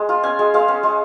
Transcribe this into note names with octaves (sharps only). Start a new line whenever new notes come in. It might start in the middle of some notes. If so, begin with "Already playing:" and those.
Already playing: G#3
F4
C#4 G#5
G#3
G#3 F5
C#4
G#3